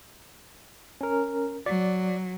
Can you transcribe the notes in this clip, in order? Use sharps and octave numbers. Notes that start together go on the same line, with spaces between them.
C#4 A#4
F#3 D5